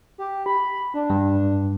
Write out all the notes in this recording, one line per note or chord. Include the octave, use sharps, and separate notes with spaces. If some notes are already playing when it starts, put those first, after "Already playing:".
G4
B5
D4
G2